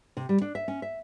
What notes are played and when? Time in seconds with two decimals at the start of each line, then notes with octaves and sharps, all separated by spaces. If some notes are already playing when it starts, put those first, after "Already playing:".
0.17 C3
0.29 G3
0.41 D4
0.55 E5
0.68 C#4
0.82 E5